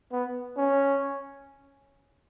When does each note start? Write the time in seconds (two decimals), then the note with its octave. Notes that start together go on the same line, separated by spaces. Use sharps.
0.12 B3
0.57 C#4